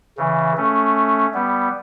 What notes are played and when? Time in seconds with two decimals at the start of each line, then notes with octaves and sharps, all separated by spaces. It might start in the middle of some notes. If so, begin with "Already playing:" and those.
0.18 C#3 E3
0.57 A3 C#4
1.34 G3 B3